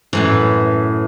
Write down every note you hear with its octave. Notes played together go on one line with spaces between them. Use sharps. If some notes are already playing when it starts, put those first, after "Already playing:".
F#2 A2 E3